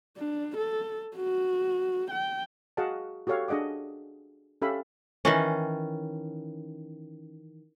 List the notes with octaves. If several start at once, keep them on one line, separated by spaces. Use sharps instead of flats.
D4
A4
F#4
G5
F#4 G#4 D#5 F5 F#5 A5
F#4 G4 A4 C#5 F5
D4 G#4 D#5 F#5 D6
C#4 G4 A4 E5 F5 B5
D#3 E3 C#4